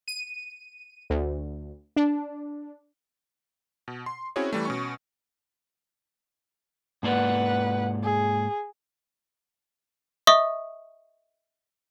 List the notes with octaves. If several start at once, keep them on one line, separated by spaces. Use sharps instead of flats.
D#7
D2
D4
B2
C6
C4 C#4 E4 F#4 G#4 C#5
E3 G3 A3
B2 C#4 C#6
G#2 A#3 B4 D5 F#5
G#4
D#5 E5 C#6 D#6